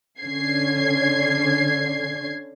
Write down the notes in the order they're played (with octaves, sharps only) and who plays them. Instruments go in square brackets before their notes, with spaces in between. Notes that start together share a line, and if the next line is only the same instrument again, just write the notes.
[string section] D3 C#4 G#6 C7